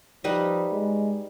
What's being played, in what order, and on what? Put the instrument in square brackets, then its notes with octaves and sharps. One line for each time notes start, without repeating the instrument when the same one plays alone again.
[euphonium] F3 [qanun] G3 D#4 B4
[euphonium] G#3